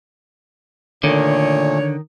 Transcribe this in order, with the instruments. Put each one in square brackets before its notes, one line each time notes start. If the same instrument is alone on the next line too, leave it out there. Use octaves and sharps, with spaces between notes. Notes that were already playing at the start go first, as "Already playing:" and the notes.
[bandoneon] A#2 A3 [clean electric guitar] D3 [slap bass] D#3 [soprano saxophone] C#5